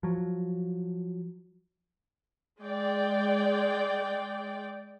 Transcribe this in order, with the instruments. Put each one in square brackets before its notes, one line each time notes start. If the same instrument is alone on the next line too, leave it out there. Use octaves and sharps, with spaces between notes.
[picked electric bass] F3 F#3
[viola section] G#3 D5 G5